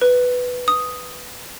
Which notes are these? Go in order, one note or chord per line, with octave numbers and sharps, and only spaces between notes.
B4
D#6